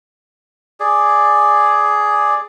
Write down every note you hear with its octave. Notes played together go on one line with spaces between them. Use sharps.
G#4 D5